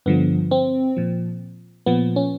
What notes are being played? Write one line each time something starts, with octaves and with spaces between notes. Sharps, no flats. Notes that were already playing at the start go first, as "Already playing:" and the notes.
G2 D3 F3 B3
C4
A#2 F3
A#2 F3 B3
C#4